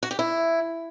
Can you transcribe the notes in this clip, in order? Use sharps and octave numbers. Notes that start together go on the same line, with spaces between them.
F#4
G4
E4